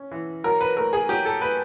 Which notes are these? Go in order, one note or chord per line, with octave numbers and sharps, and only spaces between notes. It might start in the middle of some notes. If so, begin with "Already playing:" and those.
Already playing: C#4
E3
F#3 A#4
B4
A3 A#4
G#4
F#3 G4
A4
A3 B4